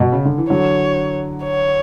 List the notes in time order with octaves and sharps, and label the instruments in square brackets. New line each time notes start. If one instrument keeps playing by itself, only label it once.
[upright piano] B2
C#3
D3
E3
[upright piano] D3 F#3 [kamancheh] C#5
[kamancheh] C#5